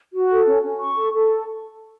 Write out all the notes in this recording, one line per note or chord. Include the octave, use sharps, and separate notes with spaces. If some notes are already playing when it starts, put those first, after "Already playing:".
F#4
A4
C#4
C#4
C#6
A4
A4